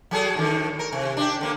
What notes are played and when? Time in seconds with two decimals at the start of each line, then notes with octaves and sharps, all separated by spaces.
0.11 F#3 G#4 A4
0.35 A2 D3 D#3
0.79 A#4
0.93 C3
1.17 D4 G4
1.41 D3 A#3